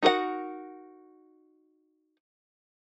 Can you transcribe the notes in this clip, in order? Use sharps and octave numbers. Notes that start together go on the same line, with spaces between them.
D#4 F#4 A#4 C#5 F#5